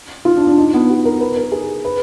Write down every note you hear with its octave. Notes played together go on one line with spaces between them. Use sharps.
F4
D4
D4
D#4
B3
F#4
A#4
B4
A#4
G#4
B4